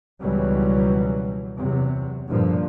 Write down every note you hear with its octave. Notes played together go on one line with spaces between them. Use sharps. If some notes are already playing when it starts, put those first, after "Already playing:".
C#2 B2 E3 F#3 G3
E2 C3 F#3
G2 A#2 D3 F3